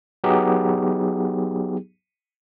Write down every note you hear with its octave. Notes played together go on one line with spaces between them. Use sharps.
F#3 B3 D#4 G4 G#4